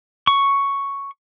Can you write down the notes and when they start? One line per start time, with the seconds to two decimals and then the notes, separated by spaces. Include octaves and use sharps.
0.27 C#6